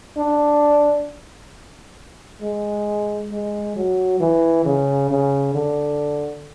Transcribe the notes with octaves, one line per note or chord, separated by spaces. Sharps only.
D4
G#3
G#3
F#3
E3
C#3
C#3
D3